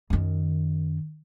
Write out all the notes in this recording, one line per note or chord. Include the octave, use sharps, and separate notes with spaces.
F#2 D#3